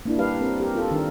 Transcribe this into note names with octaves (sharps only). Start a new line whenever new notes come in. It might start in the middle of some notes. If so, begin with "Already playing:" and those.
A#3 D4 E4
G3 G4 B4 F5
C4 A#4
G4 A#4
F4 A4
D#3 D4 A#4